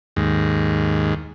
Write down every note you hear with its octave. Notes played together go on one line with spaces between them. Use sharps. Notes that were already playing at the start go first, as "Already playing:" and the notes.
D#2 G#2